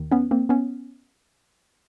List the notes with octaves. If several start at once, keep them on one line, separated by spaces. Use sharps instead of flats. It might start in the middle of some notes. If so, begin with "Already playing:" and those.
Already playing: D#2 D#3
B3 C#4
A#3 C4
B3 C#4